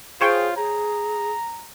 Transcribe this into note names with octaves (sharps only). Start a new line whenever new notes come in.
F4 G#4 C5 C#5 G5
G#4 A#5